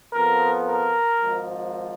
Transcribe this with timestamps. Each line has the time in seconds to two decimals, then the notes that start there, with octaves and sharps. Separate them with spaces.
0.12 F2 F3 B3 A#4
0.65 A#4
1.18 G#1 G#2 F3